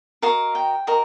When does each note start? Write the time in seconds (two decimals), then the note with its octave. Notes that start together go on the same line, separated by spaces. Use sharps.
0.22 F#4 A#4 D#5 F5
0.55 G5
0.87 F#4 A#4 D#5